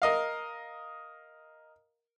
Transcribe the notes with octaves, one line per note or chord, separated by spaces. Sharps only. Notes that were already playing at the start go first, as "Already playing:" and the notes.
A#4 D#5 F5